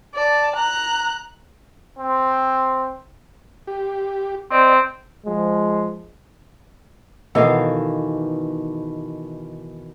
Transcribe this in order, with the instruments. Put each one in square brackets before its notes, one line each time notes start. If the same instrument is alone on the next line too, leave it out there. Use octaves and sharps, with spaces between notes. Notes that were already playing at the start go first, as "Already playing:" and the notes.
[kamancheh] D5 A5
A#5 F#6
[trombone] C4
[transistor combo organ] G4
[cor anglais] C4 [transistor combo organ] D5 D#5
[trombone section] F3 G#3
[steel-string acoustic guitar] B2 D#3 E3 [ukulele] A4 D#5 F5